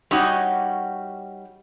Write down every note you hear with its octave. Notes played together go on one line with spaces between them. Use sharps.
G3 C#4 D#4 F#4